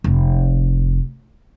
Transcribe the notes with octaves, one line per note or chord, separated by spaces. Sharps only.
F1